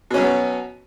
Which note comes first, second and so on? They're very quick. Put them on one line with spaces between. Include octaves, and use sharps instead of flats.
B2 C#4 F#3 B3